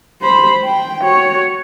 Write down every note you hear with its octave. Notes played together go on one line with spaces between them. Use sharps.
C5 B5
G5
F#4 C#5